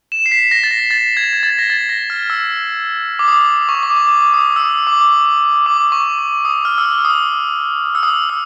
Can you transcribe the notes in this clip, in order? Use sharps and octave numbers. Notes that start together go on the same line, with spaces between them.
E7
C7
B6
A#6
A6
A#6
A6
G#6
G#6
A6
A#6
A6
A#6
F6
E6
D6
D#6
C#6
D6
C#6
D6
C#6
D6
D6
D#6
E6
D#6
D6
D6
C#6
D6
D#6
F6
E6
F6
E6
D#6
E6
D#6
E6